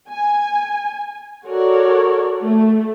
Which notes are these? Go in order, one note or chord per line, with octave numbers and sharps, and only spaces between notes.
G#5
F#4 A4 A#4 C#5 D5
A3